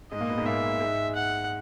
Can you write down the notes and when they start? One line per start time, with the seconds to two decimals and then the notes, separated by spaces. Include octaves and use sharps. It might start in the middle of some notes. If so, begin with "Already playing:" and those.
0.12 G#2 G#3 D#5
0.21 A#2 A#3
0.30 B2 B3
0.37 G#2 G#3
0.46 A#2 A#3 E5
0.81 G#2 G#3
1.15 F#5